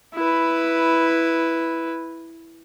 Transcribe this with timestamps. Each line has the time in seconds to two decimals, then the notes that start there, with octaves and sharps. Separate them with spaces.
0.15 E4 B4